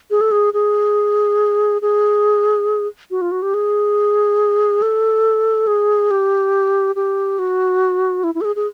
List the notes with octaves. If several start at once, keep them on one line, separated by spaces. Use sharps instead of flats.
G#4
A4
G#4
G#4
G#4
F#4
F4
F#4
G4
G#4
A4
G#4
G4
G4
F#4
E4
E4
A4
G#4
G#4